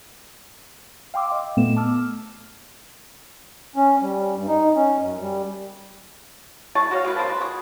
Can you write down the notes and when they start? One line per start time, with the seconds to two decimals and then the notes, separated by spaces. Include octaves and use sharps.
1.14 F5 G5 C6 D6 E6
1.28 D#5 F5 G5
1.57 A#2 A3 B3 E7
1.76 A5 D6 E6 F6
3.76 C#4
4.01 G3
4.36 G2
4.48 D#4
4.76 C#4
5.00 F#2
5.21 G3
6.75 E3 G#3 A5 C#6
6.91 F#4 C#5 F5
7.05 G#3 A#3 B4
7.16 C#3 A#3 C5 A5
7.28 G#3 B4
7.40 F#4 G#4